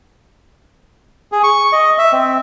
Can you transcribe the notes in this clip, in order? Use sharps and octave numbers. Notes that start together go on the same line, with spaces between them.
G#4
C#6
D#5
E5
C4